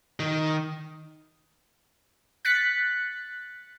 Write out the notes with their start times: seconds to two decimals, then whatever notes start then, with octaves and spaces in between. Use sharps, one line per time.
0.20 D#3
2.45 F#6 A6 B6 C#7